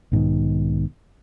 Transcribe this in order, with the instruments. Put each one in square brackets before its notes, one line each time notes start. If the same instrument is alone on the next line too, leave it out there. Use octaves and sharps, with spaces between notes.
[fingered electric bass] B1 G#2 B2 D#3